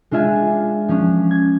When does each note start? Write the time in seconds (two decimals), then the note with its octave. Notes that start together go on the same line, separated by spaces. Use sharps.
0.11 G#3 D4 F4 E5 G#5
0.88 F3 C#4 D4
1.31 G#6